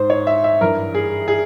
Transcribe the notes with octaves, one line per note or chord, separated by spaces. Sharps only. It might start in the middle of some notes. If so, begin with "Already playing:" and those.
Already playing: G#2 C5
C#5
E5
E5
G2 E3 A#4
G#4
G#4